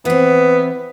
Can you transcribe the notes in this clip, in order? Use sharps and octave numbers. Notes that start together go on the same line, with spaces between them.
E3 B3 C4